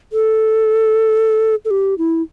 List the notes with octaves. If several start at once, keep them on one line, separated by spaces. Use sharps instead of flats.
A4
A4
G4
E4